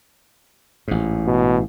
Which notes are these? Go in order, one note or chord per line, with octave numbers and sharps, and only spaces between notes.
A1 G#2
B2